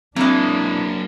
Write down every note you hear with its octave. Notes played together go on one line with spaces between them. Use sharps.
E3 F#3 G#3 A#3 C4 D4